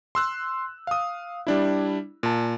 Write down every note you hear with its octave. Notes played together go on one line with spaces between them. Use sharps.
C6 E6 F#6
F5 D#6
G3 D4 E4
A#2 A5